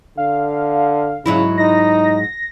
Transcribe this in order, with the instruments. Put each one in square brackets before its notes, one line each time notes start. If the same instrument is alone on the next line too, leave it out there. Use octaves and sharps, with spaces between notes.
[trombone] D3 [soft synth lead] F5
[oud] G#2 F#3 E4 [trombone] C#3
[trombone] D#4 [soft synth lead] A#6